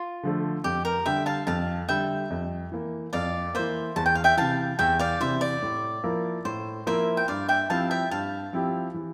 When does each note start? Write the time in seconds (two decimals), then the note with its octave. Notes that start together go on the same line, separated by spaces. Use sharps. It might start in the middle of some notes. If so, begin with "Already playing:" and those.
Already playing: F4
0.23 D3 F3 A3
0.64 F2 G4
0.85 A#4
1.06 D3 G3 E5 G5
1.26 F5 A5
1.47 F2 F5 A5
1.89 D3 G3 E5 G5
2.30 F2
2.72 E3 A#3
3.13 F2 D5 F5
3.55 E3 A#3 C5 E5
3.96 E2 A5
4.06 G5
4.15 F5
4.24 E5 G5
4.37 C3 E3 F5 A5
4.79 E2 E5 G5
4.99 D5 F5
5.20 C3 E3 C5 E5
5.41 D5
5.62 A2
6.04 F3 A#3 E4 A#4
6.45 A2 C5
6.87 F3 A#3 E4 A#4 C5 E5
7.17 G5
7.28 G2 D5 F5
7.48 E5 G5
7.70 F3 C4 E4 G4 F5 A5
7.91 E5 G5
8.11 G2 F5 A5
8.53 F3 C4 E4 G4
8.94 E3